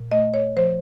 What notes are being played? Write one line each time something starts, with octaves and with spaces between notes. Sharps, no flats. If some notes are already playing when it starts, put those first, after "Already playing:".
Already playing: A#2
A3 D#5
C#5
F3 C5